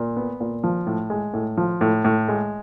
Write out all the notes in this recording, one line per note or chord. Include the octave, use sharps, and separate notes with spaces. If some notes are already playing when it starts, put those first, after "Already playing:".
Already playing: A#2
B3
A#2
F3
A2
G#3
A2
F3
A2
A2
G#3